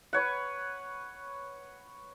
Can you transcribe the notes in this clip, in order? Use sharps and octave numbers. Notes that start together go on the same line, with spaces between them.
B4 C#5 F#5